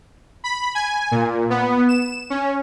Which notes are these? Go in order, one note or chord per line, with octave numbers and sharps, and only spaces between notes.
B5
G#5
A#2
B3
E7
C#4